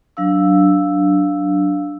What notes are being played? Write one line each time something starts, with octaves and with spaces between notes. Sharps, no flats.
F#3 D4 F5 E6